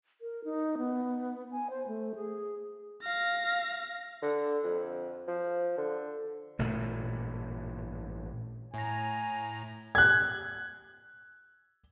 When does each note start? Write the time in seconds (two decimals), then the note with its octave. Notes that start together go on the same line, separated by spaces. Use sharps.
0.21 A#4
0.44 D#4
0.78 B3
1.51 G#5
1.70 C5
1.87 A3
2.15 G#4
3.03 F5 A#6
4.22 D3
4.64 F2
5.28 F3
5.78 D3
6.59 A1 G2 A#2 A3
8.74 A2 G#5 A#5
9.95 F#6 G#6